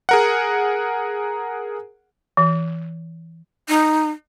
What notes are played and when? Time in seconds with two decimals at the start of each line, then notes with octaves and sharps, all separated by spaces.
0.09 G#4 A#4 F#5
2.37 E3
3.69 D#4